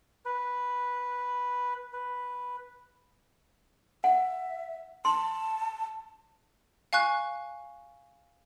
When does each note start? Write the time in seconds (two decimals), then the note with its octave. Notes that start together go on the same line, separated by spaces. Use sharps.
0.26 B4
1.93 B4
4.04 E5 F#5
5.05 A5 C6
6.93 F5 G#5 C#6 F#6